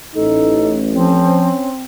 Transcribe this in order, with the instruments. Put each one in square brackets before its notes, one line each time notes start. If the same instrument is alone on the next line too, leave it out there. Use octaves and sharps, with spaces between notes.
[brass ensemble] A1 [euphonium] D#4 [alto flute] A4
[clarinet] F3 [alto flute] C4 [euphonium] C#4